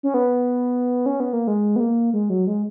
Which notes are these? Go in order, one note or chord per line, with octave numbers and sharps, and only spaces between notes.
C#4
B3
C#4
B3
A#3
G#3
B3
A#3
G#3
F#3
G#3